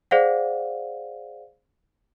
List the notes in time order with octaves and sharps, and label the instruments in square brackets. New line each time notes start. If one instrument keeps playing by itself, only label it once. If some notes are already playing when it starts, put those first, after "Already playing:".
[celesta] G#4 C5 D5 F5 F#5